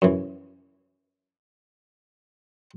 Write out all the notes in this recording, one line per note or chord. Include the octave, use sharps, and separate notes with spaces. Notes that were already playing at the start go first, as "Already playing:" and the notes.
F#2 E3